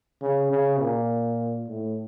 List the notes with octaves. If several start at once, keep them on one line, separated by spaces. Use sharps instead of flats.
C#3
C#3
A#2
A2